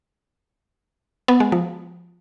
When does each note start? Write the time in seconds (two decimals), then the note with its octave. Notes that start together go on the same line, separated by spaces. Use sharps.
1.28 B3
1.40 G#3
1.52 F3